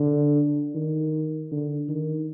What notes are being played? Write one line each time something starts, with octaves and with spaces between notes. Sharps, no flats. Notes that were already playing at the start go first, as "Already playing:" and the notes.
Already playing: D3
D#3
D3
D#3